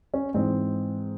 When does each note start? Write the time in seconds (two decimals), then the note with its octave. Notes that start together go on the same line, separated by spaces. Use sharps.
0.14 C#4
0.34 G#2 E3 C4